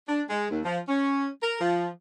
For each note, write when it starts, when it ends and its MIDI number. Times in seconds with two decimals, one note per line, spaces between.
0.08 0.23 62
0.29 0.49 56
0.51 0.60 39
0.65 0.79 53
0.88 1.28 61
1.43 1.57 70
1.61 1.88 53